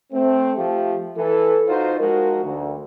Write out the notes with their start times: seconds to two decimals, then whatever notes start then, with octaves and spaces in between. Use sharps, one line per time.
0.13 A3 C4
0.57 F3 A3 G4
1.18 E3 A4
1.68 D#4 F4 F#4 C5
1.99 F3 G#3 D#4 F#4 A#4
2.44 D2